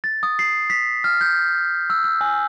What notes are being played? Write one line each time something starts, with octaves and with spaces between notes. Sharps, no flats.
A6
D#6
C7
B6
F6
G6
E6
E6
G#5